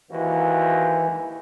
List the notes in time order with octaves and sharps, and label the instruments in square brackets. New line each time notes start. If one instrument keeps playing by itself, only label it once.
[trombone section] D#2 G#2 F#4 [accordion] E3